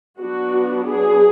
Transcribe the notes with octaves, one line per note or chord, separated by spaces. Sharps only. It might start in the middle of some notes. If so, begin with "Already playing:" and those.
F#3 B3 D4 F#4
G#4